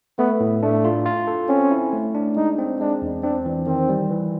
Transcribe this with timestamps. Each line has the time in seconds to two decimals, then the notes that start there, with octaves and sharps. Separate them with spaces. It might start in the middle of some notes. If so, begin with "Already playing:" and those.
0.18 A3 B3
0.40 A2
0.62 A3 D4
0.84 F4
1.06 F4
1.28 A4
1.49 C4 C#4
1.71 E4
1.93 A3
2.15 D4
2.36 G#3 D#4
2.58 C4
2.80 G#3 D4
3.02 E2
3.23 C4 D4
3.46 E3
3.67 D#3 C4
3.89 G3
4.10 E3